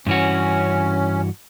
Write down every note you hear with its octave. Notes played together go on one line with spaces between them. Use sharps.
G2 E3 C#4 F#4